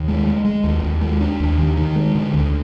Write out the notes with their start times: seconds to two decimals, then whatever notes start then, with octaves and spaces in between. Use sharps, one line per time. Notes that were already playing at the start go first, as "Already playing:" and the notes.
Already playing: D#2
0.08 G#3
0.27 G#3
0.45 G#3
0.64 D#2
0.84 D#2
1.01 G#3
1.21 D4
1.40 D#2
1.58 D#3
1.77 D#3
1.96 G#3
2.15 D3
2.34 D2